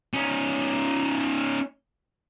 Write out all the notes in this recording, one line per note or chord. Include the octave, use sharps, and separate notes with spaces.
C#4 D#4